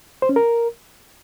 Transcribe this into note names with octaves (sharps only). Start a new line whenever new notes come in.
C5
C#4
A#4